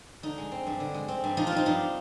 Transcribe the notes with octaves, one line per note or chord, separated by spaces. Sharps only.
D3 D#4
G#3
C4
G2
D3
G#3
C4
G2
F3 D#4
F4
C4 D#4
G2 D#4